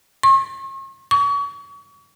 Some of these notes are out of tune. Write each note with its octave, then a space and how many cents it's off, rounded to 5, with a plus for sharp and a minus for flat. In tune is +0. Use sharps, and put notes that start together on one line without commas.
C#6 -45
C#6 +35